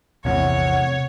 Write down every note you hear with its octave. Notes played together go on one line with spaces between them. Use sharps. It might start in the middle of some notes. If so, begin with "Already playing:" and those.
A#1 E2 A2 C3 C4 C#5 F#5